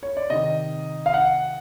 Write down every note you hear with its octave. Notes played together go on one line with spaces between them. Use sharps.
C#5
D5
C3 D#3 D#5
F5
F#5